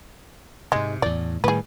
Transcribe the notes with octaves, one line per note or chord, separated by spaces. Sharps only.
G#2 C3 G#3
E2 A2 D5
A2 D#3 G3 G#4 B4